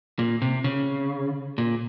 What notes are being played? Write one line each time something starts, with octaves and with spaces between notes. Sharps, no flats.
A#2
C3
C#3
A#2